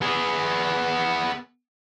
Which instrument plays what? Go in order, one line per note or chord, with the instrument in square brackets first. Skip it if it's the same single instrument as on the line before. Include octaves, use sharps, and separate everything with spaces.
[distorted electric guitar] B3 G#4